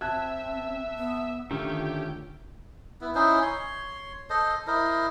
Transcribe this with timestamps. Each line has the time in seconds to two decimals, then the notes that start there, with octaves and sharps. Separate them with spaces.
0.01 C4 E5 A5 F#6 G#6
0.96 B3
1.51 D3 D#3 A3 C#4 F4 G4
3.01 B3 E4
3.15 C#4 D#4 E4 C5
3.42 C#5 C6
4.30 A4 C5 D#5
4.67 E4 A#4 C5 D#5